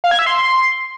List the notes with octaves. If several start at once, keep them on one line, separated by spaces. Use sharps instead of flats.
F5
G#6
E5
C6